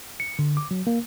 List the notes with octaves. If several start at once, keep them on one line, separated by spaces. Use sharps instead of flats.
C#7
D3
D6
F#3
A#3